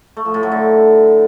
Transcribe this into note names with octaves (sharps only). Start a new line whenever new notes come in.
A3
F3
A2
F#3
D3